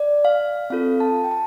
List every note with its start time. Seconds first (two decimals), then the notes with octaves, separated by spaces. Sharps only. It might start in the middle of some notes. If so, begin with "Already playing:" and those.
Already playing: D5
0.25 F5
0.70 C4 F4 A4 F5
1.00 A5
1.24 G5
1.31 A5